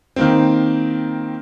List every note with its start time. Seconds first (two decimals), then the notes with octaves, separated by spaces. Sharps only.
0.16 D#3 A#3 C4